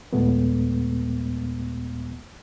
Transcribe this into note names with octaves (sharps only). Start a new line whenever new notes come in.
D#2 A#2 G#3 A3 B3